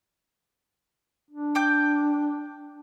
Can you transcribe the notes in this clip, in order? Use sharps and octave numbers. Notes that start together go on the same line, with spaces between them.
D4
G5 D6 G6